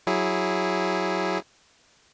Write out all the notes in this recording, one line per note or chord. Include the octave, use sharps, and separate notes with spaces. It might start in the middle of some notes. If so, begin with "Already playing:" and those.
F#3 E4 G#4